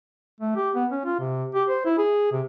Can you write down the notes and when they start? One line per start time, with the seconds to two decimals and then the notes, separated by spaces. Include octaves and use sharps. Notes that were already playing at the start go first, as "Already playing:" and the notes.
0.41 A3
0.56 G4
0.75 B3
0.91 C#4
1.05 F4
1.19 C3
1.55 G4
1.69 C5
1.85 E4
1.98 G#4
2.32 C3